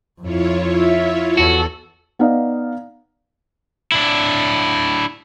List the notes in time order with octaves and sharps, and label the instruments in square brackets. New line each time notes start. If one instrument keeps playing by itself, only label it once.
[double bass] F2 [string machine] E4 F4 C#5
[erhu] E5
[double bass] E2 [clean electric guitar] F#4 [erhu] A4
[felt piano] B3 D#4 D5 F5
[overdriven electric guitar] D4 E4